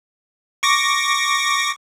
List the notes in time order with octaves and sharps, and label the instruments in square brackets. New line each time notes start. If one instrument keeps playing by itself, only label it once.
[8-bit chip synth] C#6 D6 A#6